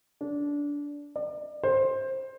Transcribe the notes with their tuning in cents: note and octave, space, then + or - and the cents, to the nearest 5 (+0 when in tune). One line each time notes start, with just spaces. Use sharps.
D4 -20
D5 +35
C5 +15